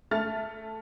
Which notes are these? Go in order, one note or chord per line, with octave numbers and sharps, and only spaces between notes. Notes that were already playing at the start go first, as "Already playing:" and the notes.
A3 F6 A6